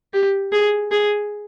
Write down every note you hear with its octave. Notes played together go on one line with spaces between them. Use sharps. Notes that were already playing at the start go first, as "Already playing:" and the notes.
G4
G#4
G#4